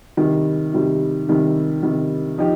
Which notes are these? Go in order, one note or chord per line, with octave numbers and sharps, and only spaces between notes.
C3 D#3 G3
C3 D#3 G3
C3 D#3 G3
C3 D#3 G3
F3 D#4 G4